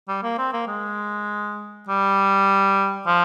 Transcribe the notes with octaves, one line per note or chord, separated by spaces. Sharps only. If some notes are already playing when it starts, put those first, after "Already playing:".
G3
A#3
C4
A#3
G#3
G3
F3